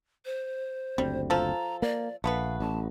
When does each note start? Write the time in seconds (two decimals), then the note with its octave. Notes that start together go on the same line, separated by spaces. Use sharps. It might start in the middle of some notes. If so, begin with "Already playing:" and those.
0.25 C5
0.98 F#1 D2 G3 C4
1.30 F3 A4 A#5
1.82 A#3 D5
2.24 A#1 A3 B3 B4 F5
2.60 A1 A5